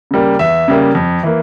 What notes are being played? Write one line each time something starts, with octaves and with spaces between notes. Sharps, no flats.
C#3 G3 A#3
E2 E5
C#3 G3 A#3
F2
E3 A#3